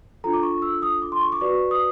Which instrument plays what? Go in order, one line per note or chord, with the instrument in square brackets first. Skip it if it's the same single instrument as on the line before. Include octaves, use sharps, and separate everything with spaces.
[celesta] D4 F4 A4 A#5
D6
C#6
E6
D#6
D6
C6
C#6
D6
F#4 B4 D5 C#6
D#6